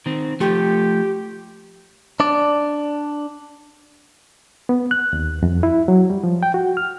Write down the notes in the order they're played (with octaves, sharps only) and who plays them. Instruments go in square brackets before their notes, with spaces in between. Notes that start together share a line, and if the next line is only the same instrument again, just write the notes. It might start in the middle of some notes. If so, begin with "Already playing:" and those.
[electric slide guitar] D#3 C4
[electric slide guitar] F3 A3 [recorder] G4
[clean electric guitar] D4 D5
[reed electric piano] B3
F#6
D#2
F2
E4
F#3
G3
F3
G5
F#4
F6